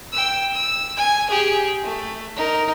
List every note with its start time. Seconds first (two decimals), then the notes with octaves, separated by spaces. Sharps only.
0.12 G5 E6
0.54 E6
0.96 G#5
1.30 G4 G#4
1.83 A3
2.36 D#4 A#4